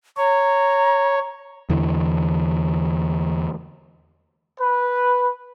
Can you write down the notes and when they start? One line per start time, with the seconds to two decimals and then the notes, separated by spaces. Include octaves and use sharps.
0.17 C#5 A#5
1.70 E2 D3 E3
4.61 B4